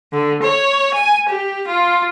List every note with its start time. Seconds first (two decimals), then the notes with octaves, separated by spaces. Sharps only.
0.12 D3
0.41 C#5
0.94 G#5
1.27 G4
1.68 F4